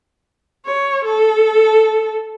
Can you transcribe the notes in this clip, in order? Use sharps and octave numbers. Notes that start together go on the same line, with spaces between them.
C#5
A4